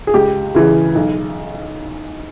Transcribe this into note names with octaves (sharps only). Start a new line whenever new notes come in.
G#4
C#2 G4
C#3 E3
B1